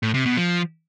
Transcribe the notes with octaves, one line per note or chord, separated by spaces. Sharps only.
A2
C3
B2
F3